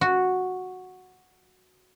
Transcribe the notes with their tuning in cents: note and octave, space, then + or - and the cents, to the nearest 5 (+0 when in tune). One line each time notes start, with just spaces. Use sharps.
F#4 -5